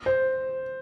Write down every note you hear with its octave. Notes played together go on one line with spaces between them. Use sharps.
C5